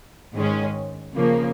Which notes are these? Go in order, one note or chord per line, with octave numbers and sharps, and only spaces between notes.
G#2 D#3 G#3 C#4
C#3 F3 A#3